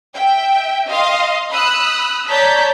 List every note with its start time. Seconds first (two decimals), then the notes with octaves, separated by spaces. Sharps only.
0.15 E5 G5
0.87 D#5 F5 C6
1.51 B5 D#6 E6 F#6
2.28 C#5 D5 A5 A#5 G6 B6